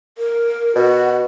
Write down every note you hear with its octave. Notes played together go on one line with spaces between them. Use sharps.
A#4
B2 F#4